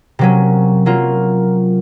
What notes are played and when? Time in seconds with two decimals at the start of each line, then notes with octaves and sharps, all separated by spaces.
0.19 C3 F#3 A#3 C#4
0.86 F#3 A#3 F4